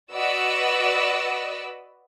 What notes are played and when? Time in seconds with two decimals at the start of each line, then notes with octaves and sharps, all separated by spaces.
0.12 F#4 B4 D5 D#5 E6